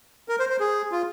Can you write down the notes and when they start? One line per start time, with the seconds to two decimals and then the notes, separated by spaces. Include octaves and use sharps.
0.29 A#4
0.39 C5
0.49 C5
0.60 G#4
0.91 F4